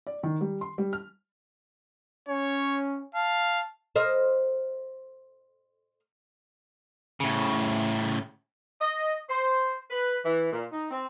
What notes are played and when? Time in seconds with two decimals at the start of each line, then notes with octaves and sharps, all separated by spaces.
0.07 D5
0.23 D#3
0.41 G3
0.61 C6
0.78 G3
0.93 F6
2.28 C#4 C#5
3.15 F5 A5
3.96 A#4 C5 D#5
7.20 A2 C#3
8.81 D#5
9.29 C5
9.91 B4
10.24 E3
10.51 A#2
10.71 D#4
10.90 C4